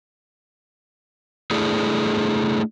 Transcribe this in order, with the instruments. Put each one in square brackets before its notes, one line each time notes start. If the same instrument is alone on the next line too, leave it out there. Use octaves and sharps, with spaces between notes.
[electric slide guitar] A3 D4 E4 G#4 A4